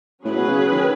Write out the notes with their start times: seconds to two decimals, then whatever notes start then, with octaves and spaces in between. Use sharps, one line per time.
0.25 A2 F#3 C#4 G#4 B4
0.37 B2
0.49 C#3
0.72 D#3